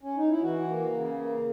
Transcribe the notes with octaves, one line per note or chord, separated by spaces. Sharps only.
C#4
D#4
E4
E3 F#4
A#3
C#3
A#3